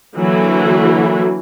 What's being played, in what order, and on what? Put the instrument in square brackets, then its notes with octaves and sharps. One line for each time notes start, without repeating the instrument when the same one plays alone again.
[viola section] D3 E3 F#3 A#3 E4 F#4